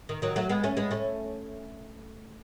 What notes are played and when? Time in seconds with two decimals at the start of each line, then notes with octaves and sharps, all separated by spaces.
0.09 D#3
0.22 D#3 F#3
0.36 F#3 A3
0.49 G#3 B3
0.64 A3 C#4
0.77 G#3 B3
0.91 A3 C#4